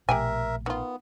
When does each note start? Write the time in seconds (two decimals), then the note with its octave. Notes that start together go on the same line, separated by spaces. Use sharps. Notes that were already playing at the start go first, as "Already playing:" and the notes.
0.09 A#1 B2 A3 G4 A#4 E5 G5 G#5
0.66 D#3 B3 F4